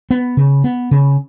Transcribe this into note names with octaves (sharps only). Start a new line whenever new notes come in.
B3
C#3
B3
C#3